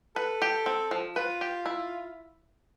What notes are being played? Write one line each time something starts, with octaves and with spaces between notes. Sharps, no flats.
A4 B4
G4
C4
F3
F4 B4
G4
E4